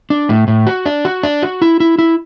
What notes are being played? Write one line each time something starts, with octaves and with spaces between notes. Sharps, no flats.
D4
A2
A2
F#4
D4
F#4
D4
F#4
E4
E4
E4